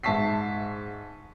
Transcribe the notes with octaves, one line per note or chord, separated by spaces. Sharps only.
G#2 E5 A5 C#6 B6 C7